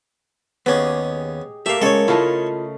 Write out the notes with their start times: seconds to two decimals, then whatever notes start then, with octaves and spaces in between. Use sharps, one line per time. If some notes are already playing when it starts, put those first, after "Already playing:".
0.66 D#2 B3 C#4 G4 G#4 D#5
1.66 A3 A#3 G4 E5 F5
1.82 G#3 C#4 A4 C#5
2.08 C#3 A3 E4 F4 D#5 A5